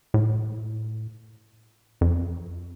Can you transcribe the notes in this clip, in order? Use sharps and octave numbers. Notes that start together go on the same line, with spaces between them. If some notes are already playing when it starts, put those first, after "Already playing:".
A2
F2